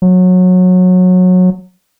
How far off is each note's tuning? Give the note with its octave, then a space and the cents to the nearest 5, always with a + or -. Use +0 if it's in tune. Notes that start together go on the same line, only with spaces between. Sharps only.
F#3 -20